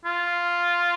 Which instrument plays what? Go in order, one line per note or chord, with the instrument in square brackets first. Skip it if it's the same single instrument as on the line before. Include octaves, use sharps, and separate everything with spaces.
[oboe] F4